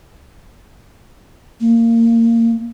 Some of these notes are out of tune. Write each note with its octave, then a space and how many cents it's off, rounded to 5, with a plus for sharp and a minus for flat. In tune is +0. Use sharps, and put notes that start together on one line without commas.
A#3 -20